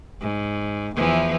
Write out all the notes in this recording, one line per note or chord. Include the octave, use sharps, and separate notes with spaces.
G#2
E2 E3 F3